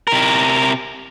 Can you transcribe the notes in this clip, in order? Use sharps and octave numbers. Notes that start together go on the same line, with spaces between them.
C3 A#4